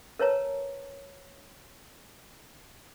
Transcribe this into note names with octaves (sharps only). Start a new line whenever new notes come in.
A#4 B4 C#5 A5 A#5